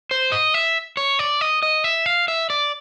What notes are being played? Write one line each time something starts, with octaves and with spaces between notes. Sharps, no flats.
C5
D#5
E5
C#5
D5
D#5
D#5
E5
F5
E5
D5